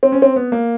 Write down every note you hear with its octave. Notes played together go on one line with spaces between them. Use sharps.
C4
C#4
C4
B3
A#3